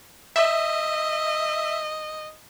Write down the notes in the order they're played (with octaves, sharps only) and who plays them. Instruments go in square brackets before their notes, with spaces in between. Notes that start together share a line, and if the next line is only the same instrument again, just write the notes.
[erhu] D#5 [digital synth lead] E5